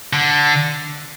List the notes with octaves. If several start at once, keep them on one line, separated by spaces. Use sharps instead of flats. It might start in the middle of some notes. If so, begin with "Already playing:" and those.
D3